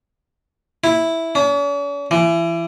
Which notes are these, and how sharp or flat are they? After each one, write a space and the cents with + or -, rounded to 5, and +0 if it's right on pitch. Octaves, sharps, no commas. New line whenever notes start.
E4 -5
C#4 +45
E3 +30